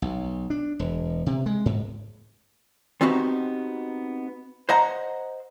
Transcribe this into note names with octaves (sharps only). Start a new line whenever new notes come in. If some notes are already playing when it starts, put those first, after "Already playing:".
B1
D4
E1
C3
G#3
G#2
B3 C4 D#4 F#4 G4
C5 D#5 F#5 A#5